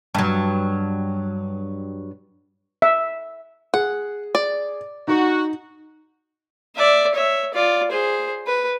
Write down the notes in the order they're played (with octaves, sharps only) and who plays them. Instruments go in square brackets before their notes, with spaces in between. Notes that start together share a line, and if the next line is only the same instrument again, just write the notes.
[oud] G2 F#3
[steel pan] E5
[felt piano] G#4 [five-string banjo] F#5
[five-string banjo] D5
[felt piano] D#4 [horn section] F#4
[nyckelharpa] D5 E5
C#5 E5
F4 D5
G#4 C5
B4